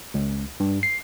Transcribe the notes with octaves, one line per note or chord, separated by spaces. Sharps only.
C#2
G2
C7